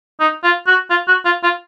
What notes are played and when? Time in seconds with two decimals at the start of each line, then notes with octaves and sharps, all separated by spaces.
0.20 D#4
0.44 F4
0.67 F#4
0.90 F4
1.08 F#4
1.25 F4
1.43 F4